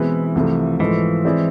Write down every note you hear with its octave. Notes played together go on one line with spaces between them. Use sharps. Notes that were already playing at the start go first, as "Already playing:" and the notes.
Already playing: B2 E3 G#3 C4 E4 B4
C2 C3 F3 A3
G#2 E3 F3 A3
G#3 C4 E4 G#4 D5